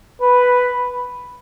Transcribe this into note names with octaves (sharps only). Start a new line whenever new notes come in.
B4